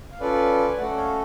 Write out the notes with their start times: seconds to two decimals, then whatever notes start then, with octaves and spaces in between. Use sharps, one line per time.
0.12 F5
0.20 C#4 F4 A4 B4 D5
0.68 G#5
0.77 A3 C#4 F#4 A4 D5 F#5
0.97 C#5 F5